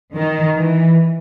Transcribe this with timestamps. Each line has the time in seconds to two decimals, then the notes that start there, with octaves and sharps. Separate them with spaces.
0.14 D#3
0.56 E3